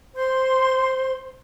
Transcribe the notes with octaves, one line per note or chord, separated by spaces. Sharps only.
C5 C6